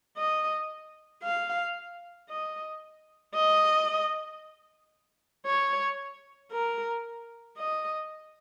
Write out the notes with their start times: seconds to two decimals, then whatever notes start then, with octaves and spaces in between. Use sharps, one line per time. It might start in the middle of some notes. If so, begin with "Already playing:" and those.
0.17 D#5
1.23 F5
2.29 D#5
3.35 D#5
5.46 C#5
6.52 A#4
7.58 D#5